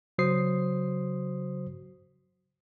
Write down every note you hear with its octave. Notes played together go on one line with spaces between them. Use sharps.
C#3 F#3 F#4 C5 D#6 C7